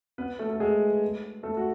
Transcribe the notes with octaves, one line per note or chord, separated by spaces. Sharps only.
B3 B4
A3 A4
A4
G#3 G#4
A3 A4
F#4